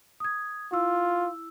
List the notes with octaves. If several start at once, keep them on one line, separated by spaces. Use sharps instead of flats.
D#6 G#6
E4 F4 E6